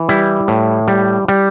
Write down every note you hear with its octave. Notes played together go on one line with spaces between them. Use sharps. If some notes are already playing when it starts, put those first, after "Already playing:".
Already playing: E3
G3 E4
A2
G3
G3